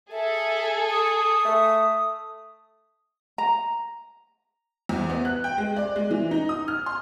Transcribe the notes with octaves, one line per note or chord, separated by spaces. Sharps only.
G#4 A4 E5
D#6
A3
A#5
E2
B3
F#6
G5
G#3
D5
G#3
E3
D#4
D#6
F6
C6